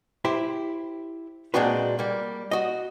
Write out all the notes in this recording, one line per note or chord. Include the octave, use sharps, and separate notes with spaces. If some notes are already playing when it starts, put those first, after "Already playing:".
E4 G4 C5
A#2 G#3 C4 D4 F#4 B4
G3 A#3
F#4 D#5